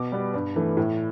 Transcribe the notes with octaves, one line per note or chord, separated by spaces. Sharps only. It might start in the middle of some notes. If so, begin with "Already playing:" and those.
Already playing: B2 D6
G3 B3
G2
E3 A3
A2